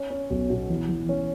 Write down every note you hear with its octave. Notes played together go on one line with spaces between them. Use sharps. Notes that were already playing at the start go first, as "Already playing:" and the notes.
Already playing: C#4
C#4
B1
B2
E3
E3
C#4